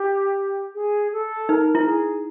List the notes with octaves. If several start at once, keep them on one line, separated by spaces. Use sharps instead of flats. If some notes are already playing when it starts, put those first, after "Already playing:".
Already playing: G4
G#4
A4
D#4 A#4
E4
G#4